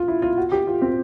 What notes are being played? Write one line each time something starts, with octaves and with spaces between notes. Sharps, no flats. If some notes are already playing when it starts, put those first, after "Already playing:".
Already playing: F4
E4
F4
F#4
G4
F4
C4